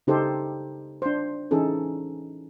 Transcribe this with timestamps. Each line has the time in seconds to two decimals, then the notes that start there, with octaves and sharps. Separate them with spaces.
0.07 C#3 D#4 G4 A4 C5
1.02 D4 C5
1.51 E3 C#4 D#4 G#4 A4